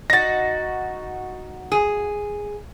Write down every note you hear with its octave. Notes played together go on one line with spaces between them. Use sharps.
D#4 F#4 A6 A#6
G#4